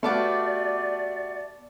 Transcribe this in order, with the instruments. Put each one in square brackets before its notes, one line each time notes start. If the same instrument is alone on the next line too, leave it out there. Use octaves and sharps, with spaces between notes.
[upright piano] A3 [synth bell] B3 A5 D6 [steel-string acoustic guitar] F#4 G4 F5 [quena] D5